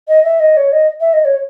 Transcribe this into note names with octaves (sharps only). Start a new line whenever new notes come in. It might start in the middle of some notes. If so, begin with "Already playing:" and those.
D#5
E5
D#5
C#5
D#5
E5
D#5
C#5